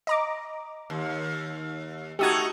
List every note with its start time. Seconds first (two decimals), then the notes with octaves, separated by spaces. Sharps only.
0.07 D#5 A#5 D6
0.90 D#2
2.19 A3 D#4 F#4 G4 D#6 G#6